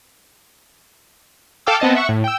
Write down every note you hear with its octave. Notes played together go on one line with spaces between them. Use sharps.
A4 F5 G5 D6 E6
B3 C4 D#5 A5
E5 F#5 C#6
A2
G5 E6